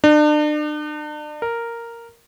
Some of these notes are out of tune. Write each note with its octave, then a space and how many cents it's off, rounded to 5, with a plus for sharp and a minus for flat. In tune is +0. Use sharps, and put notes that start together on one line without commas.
D4 +40
A#4 -5